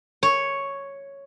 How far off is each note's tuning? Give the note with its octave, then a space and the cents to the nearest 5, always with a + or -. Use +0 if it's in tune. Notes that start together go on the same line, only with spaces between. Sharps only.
C#5 +0